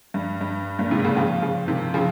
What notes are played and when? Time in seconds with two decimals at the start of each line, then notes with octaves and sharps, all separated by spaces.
0.14 G2
0.41 G2
0.79 G2 A#2
0.91 G#2 C3
1.05 A#2 C#3
1.17 C#3 F3
1.42 C#3 F3
1.68 C3 D#3
1.94 C#3 F3